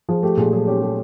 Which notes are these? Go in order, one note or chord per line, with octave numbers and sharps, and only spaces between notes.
F3 G#4
A3 G4
A#2 G#4
F#3 G#4
C#4 G4
A3 G4